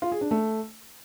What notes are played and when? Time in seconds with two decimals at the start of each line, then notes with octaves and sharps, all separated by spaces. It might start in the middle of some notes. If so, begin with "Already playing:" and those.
0.02 F4
0.12 G#4
0.21 D4
0.31 A3